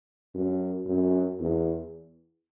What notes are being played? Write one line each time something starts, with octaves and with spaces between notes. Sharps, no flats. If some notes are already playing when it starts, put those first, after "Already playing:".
F#2
F#2
E2